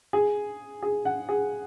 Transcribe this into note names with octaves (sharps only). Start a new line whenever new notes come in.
G#4
G#4
F#5
G#4